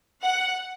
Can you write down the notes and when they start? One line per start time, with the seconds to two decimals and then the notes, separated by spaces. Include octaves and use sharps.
0.21 F#5